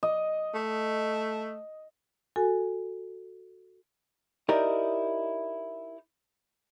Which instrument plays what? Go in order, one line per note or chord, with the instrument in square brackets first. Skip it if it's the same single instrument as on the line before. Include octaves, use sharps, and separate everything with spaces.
[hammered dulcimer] D#5
[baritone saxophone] A3
[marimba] F#4 A4 G#5
[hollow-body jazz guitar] D#4 E4 G4 A#4 D5 D#5